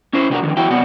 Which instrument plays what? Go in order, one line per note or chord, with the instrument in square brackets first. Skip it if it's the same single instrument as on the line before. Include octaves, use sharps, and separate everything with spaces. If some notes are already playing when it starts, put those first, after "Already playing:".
[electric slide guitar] C#4 E4 C5
C3 D4 F4 F#4 A#4
F2 D3 D#3
E3 F#3 E4 F#4 G5
C3 F#3 B3 D5 F#5